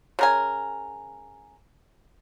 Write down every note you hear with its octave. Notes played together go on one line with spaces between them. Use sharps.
C#3 A#4 G#5